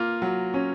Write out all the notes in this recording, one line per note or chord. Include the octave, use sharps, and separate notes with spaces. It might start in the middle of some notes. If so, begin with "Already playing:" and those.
Already playing: A#3 F4
F#3
C#4